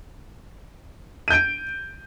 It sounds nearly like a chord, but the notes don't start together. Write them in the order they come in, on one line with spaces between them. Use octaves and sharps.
D#7 G6 D7